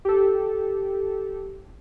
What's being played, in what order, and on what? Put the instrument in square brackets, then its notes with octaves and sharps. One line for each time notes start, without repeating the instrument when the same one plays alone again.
[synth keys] G4 A4